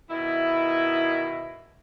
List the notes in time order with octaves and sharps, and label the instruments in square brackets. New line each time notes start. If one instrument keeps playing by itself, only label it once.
[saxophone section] B2 D#3 E4